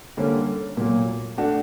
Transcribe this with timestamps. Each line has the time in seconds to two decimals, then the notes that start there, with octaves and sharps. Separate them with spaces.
0.17 D3 G3 A#3 C#4
0.77 A#2 F#3 A#3
1.37 A3 D4 F#4